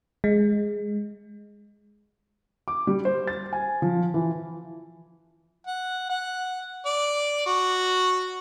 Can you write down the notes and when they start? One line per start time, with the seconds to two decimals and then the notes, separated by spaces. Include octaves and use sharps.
0.24 G#3
2.68 D6
2.87 G3
3.05 C5
3.27 A6
3.53 G#5
3.82 F3
4.14 E3
5.67 F#5
6.10 F#5
6.86 D5
7.46 F#4